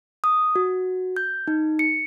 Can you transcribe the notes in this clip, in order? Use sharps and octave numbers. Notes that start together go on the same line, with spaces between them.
D#6
F#4
G6
D#4
C#7